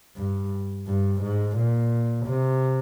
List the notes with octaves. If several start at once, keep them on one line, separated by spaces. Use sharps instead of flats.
G2
G2
G#2
A#2
C3